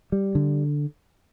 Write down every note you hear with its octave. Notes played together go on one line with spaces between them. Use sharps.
G3
D3